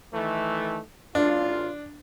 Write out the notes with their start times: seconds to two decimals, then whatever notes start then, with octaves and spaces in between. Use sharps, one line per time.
0.13 D#3 E3 A3
1.15 A1 D4 F4